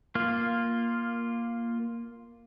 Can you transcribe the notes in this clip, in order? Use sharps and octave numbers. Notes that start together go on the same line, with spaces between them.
A#3 F4